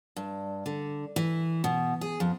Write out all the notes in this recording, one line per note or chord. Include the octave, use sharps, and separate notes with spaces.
G2
D3
E3
B2
G#4
F2